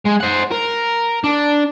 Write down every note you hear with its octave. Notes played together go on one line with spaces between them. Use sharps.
G#3
C5 F#5
A#4
D4